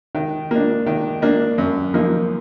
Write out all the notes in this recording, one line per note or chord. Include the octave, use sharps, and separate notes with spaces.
D#3
A#3 D4
D#3
A#3 D4
F#2
F3 A#3 D#4